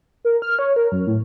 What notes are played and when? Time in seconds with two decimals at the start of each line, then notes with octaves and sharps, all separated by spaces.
0.25 A#4
0.42 F6
0.59 C#5
0.76 A#4
0.92 F#2
1.07 A2